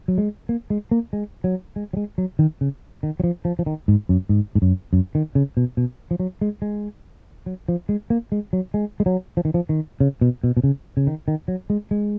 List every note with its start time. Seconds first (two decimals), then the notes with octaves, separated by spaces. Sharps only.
0.08 F#3
0.18 G#3
0.49 A#3
0.70 G#3
0.91 A#3
1.13 G#3
1.44 F#3
1.76 G#3
1.93 F#3
1.97 G#3
2.18 F#3
2.39 D#3
2.61 C#3
3.03 D#3
3.20 F#3
3.24 F3
3.45 F3
3.59 F3
3.66 D#3
3.88 G#2
4.09 F#2
4.29 G#2
4.55 G#2
4.62 F#2
4.93 F#2
5.15 D#3
5.35 C#3
5.57 B2
5.77 B2
6.11 F3
6.20 F#3
6.41 G#3
6.62 G#3
7.46 F#3
7.68 F3
7.89 G#3
8.10 A#3
8.32 G#3
8.53 F#3
8.74 G#3
9.00 G#3
9.06 F#3
9.37 F3
9.45 D#3
9.54 F3
9.69 D#3
10.00 C#3
10.21 B2
10.44 B2
10.57 B2
10.64 C#3
10.97 C#3
11.07 D#3
11.28 D#3
11.48 F#3
11.70 G#3
11.91 G#3